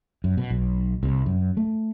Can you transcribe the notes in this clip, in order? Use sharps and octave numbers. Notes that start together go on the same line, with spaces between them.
F#2
B2
B1
C2
F#2
A3